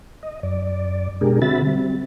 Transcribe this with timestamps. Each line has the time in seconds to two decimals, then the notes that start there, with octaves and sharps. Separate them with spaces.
0.23 D#5
0.43 F#2 D5
1.21 B2 G#3 D4 G4 G#4 A#4
1.42 D3 C4 F#4 E5 B5 A6
1.66 G3 C4